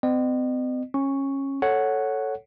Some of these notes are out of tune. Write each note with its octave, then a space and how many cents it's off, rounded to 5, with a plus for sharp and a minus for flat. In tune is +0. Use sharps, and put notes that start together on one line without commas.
C4 -40 D#5 -40
C#4 -20 C#6 +0
A4 +0 C#5 +0 F#5 +0